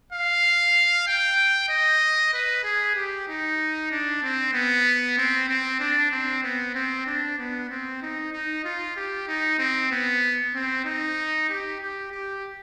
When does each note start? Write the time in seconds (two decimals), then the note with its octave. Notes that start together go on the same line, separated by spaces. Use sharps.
0.13 F5
1.07 G5
1.69 D#5
2.34 B4
2.64 G#4
2.96 G4
3.28 D#4
3.91 D4
4.23 C4
4.53 B3
5.18 C4
5.48 C4
5.80 D4
6.11 C4
6.43 B3
6.75 C4
7.06 D4
7.38 B3
7.70 C4
8.02 D#4
8.33 D#4
8.64 F4
8.96 G4
9.28 D#4
9.59 C4
9.91 B3
10.54 C4
10.85 D#4
11.49 G4
11.81 G4
12.11 G4